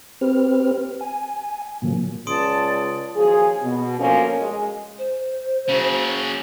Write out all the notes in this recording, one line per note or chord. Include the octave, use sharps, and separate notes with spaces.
C4 G4 B4 C5 F6
G#5
A2 D3 F3 F#3 A#3
C#2 D5 A5 C6 D#6 D7
D#2 F3 F#3 G#4
B2
D3 F3 F#3 A#3 C#4
G#3
C5
C#3 F#3